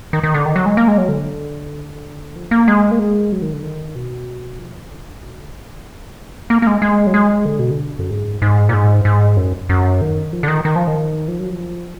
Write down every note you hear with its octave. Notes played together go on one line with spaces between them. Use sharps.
D#3
D#3
D3
D#3
F#3
G#3
A#3
G#3
F#3
D3
F3
A#3
G#3
A#3
G#3
F#3
D#3
D3
D#3
B2
F3
D3
B2
D3
F#3
A#3
A#3
A#3
G#3
G#3
F#3
G#3
D3
B2
D3
F#2
G#2
G#2
A#2
G#2
G#2
F#2
F#2
D#3
F3
D3
D#3
D#3
F3
D#3
F3
F#3
F3